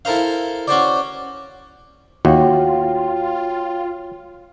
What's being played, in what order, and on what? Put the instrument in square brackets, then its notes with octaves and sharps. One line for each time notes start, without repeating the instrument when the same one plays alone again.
[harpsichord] E4 A4 A#4 C5 F5
C#4 F#4 C5 D5
[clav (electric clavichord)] D#2 [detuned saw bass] F4 [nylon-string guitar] F#4 [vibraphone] C#5 F5 G5